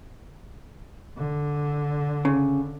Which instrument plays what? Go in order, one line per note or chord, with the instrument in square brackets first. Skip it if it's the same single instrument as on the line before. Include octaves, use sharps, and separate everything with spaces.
[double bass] D3
[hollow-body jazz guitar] C#3